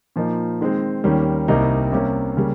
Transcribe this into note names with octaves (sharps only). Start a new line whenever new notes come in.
A#2 F3 A#3 D#4
D#3 G#3 C4
D#2 D#3 G3 A#3 C#4
C2 C3 G3 A#3 D#4
C3 G3 A#3 C#4
C#3 G3 A#3